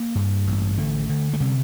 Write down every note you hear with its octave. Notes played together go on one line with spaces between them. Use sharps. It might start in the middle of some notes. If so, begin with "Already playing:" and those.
Already playing: A#3
G2
A1
D3 A3
D3
A3
C3 G3